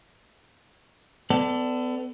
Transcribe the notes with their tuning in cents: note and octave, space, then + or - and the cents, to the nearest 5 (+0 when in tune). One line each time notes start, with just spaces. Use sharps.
B3 +35 A4 +10 D5 +0